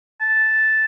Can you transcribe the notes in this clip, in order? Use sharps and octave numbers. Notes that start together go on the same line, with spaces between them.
A5